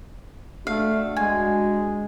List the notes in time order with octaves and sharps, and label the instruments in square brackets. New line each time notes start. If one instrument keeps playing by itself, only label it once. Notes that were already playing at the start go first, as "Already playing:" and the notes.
[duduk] A3 [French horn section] D4 F#4 [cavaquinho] F5
[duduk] G#3 [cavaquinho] G#5